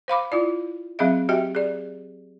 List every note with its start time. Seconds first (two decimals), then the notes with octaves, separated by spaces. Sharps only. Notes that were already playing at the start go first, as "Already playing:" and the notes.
0.08 C5 F5 B5 D6
0.32 E4 F4 D5
0.99 F#3 C4 G#4 D#5 E5
1.29 F#4 G4 D#5 E5 G5
1.55 G#4 D5